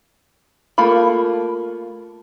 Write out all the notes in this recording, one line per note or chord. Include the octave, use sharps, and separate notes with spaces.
A3 A#3 F4 B5